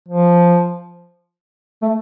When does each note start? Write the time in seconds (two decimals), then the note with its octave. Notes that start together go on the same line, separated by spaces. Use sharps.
0.09 F3
1.82 A3